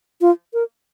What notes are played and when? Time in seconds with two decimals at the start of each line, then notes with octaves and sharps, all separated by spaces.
0.21 F4
0.54 A#4